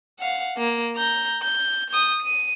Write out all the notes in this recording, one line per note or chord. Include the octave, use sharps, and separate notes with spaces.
F5 F#5
A#3
A#5 G6
G6
D#6 G6
D#7